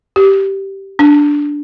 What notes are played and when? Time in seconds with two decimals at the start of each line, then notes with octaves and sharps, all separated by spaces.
0.16 G4
0.99 D4